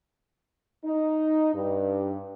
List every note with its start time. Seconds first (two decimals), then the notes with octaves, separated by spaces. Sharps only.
0.85 D#4
1.53 G2